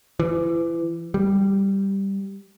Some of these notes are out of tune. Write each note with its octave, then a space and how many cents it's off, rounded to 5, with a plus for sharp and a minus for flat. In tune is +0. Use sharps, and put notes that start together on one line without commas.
E3 +30
G3 +0